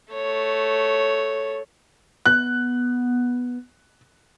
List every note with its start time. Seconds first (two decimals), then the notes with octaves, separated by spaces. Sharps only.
0.13 A3 C#5
2.26 B3 F#6